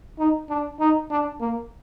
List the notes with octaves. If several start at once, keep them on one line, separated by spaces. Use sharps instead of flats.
D#4
D4
D#4
D4
A#3